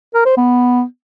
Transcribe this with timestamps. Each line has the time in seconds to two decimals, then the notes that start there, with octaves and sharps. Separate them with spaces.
0.14 A#4
0.26 C5
0.37 B3